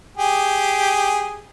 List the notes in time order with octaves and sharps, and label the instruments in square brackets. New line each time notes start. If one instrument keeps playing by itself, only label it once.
[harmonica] G4 G#4